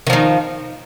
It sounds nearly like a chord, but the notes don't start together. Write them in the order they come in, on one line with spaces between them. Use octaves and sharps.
D#3 F3 D#4